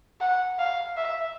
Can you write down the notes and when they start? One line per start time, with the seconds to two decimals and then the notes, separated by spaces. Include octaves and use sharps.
0.21 F#5
0.59 F5
0.97 E5